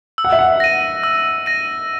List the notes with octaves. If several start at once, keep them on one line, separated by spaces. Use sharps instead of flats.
E6
F#5
E5
F#5
A#6 D#7
E6
A#6 D#7